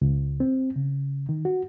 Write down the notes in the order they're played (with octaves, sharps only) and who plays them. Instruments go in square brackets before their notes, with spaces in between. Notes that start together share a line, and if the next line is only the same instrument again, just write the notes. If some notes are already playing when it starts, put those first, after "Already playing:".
[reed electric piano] C#2
C4
C#3
D#3
F#4